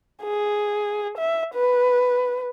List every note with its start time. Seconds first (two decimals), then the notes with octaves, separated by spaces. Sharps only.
0.22 G#4
1.18 E5
1.55 B4